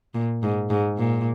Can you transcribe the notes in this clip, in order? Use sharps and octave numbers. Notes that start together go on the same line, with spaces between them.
A#2
G#2
G#2
A#2